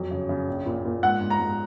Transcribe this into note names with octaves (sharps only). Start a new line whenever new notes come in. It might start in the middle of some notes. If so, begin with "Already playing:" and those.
Already playing: F2 F#3
C#3
C#3
A#1
A#2
A#2
G#2 F#5
G#2
A#5
G#2